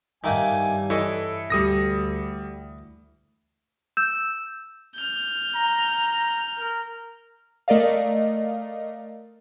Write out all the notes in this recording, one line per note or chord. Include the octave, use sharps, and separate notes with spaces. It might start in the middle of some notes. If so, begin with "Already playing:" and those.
G2 D#3 A3 A#3 G#5
E3 E4 A4 C#5 D#5
D2 G3 A4 D#6 A#6
E6 G6 E7
F6 G6
A#5
A#4
A3 A#4 D5 D#5 F5